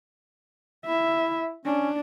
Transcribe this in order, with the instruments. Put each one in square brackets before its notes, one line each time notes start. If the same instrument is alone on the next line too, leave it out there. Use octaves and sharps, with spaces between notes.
[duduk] E4 [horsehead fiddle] E5
[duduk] C#4 [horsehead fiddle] D4